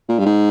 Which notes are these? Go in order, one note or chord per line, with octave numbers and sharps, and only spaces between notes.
A#2
G2
G#2